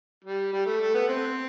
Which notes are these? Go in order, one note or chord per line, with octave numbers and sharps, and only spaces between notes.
G3
G3
A3
A3
B3
C4